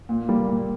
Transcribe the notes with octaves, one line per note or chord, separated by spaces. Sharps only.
A#2
G3 A#3
A#2